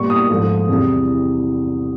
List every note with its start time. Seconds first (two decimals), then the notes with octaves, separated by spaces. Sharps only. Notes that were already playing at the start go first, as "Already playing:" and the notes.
Already playing: A#2 G3 B3 C#6
0.10 D#6
0.29 G#2 F3 A3
0.68 E2 C3 E3 G3